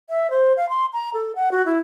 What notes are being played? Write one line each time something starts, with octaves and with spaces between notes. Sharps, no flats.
E5
C5
F5
C6
A#5
A4
F#5
F#4
E4